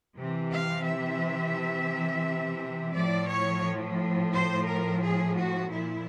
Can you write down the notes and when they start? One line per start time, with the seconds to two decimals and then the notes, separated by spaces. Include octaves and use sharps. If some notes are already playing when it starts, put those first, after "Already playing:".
0.17 C3 E3
0.51 F5
0.85 E5
2.93 A2 F3 D5
3.29 C#5
4.32 C5
4.67 A#4
5.01 G#4
5.36 F#4
5.71 A#2 F3 E4